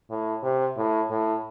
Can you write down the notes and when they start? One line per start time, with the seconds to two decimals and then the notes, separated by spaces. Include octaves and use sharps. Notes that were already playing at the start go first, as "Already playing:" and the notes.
0.10 A2
0.43 C3
0.77 A2
1.10 A2